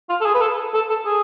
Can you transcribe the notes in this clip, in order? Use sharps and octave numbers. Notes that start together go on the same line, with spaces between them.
F4
A4
G#4
B4
A4
A4
A4
G#4